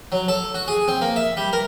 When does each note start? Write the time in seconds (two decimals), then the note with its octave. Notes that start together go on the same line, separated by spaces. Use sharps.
0.12 F#3
0.28 A4
0.54 F#4
0.68 G#4
0.88 C4
1.01 A#3
1.16 E5
1.37 G3
1.53 A#4